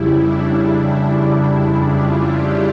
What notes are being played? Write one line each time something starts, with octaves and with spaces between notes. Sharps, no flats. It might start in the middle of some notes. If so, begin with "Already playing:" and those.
Already playing: F2 C#3 G3 E4
D4
E4
E4
F4
G4